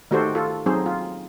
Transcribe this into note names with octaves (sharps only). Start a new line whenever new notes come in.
D#3 A3 F#4 G4 A4 C5
F4 A4
F#3 C4 D#4 G#4 C5
F4